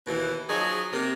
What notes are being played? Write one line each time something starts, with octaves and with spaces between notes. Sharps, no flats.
D#2 B2 E3
F3 F#3 D#4 G#4
C3 A#3